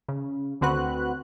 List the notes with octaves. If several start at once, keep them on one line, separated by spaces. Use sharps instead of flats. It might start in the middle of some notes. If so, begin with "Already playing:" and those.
C#3
D2 D3 C4 F#4 B4 F#6